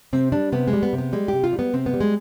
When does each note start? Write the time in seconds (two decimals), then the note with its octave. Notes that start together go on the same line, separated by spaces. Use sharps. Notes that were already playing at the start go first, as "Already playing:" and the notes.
0.13 C3 C4
0.32 G3 D4
0.52 C3 B3
0.68 G#3
0.73 G3
0.83 B3
0.93 C3
0.98 B3
1.13 G3 G#3
1.28 C3 G4
1.44 F4
1.53 G3
1.59 B3
1.73 C3 C4
1.86 B3
1.94 G3
2.00 G#3